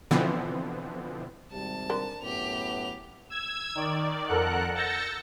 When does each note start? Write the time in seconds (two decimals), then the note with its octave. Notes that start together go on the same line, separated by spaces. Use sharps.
0.11 B2 D3 E3 F3 B3 C4
1.52 G#1 C3 G3 A5
1.90 D3 A#4
2.22 F#2 A2 B3 G4 F7
3.30 E6 G#6
3.75 D#3 D5
4.27 F2 A4 A#4 F#5 F#6
4.75 E6 G6 A6 A#6 C#7